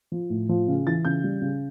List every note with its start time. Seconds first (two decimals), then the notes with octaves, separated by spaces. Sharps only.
0.12 F3
0.30 A2
0.49 F3
0.68 C#3
0.86 E3 A6
1.05 C#3 G6
1.24 G3
1.42 C#3